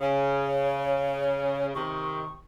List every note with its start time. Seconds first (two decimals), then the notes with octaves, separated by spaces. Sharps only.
0.01 C#3 C#5
1.75 C3 D#3 C#6